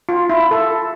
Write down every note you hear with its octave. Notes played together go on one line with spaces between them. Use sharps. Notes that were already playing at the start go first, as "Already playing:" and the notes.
F4
E4
A4